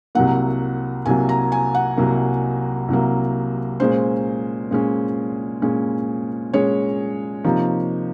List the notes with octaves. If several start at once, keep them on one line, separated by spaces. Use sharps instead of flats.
C2 C3 F#3 A#3 F#5
C2 C3 F#3 A#3 G#5
A#5
G#5
F#5
C2 C3 F#3 A#3
C2 C3 F#3 A#3
A#2 G#3 C#4 C5
A#2 G#3 C#4
A#2 G#3 C#4
A#2 G#3 C#4 C#5
C3 F3 A#3 D#4